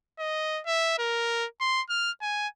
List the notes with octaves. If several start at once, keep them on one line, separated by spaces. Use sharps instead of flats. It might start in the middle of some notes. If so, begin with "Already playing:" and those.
D#5
E5
A#4
C6
F6
G#5